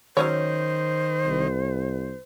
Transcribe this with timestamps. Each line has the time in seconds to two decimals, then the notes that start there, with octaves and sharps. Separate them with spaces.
0.17 D#3 F#3 C#4 C5 C#5
1.26 C2